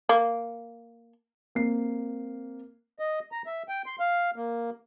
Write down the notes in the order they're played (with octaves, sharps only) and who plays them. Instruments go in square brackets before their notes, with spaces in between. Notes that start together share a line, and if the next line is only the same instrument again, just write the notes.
[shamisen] A#3
[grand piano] A#3 C4 C7
[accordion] D#5
A#5
E5
G5
C6
F5
A#3